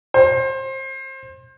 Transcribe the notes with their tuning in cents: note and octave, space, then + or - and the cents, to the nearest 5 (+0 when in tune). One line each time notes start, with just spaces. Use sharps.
C5 +25